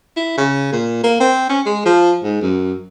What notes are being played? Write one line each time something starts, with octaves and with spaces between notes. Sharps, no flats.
E4
C#3
A#2
A#3
C4
C#4
G#3
F3
G#2
F#2